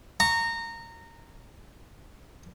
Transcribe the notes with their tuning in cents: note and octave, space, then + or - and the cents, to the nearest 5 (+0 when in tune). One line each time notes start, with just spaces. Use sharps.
A#5 -20 C#6 +0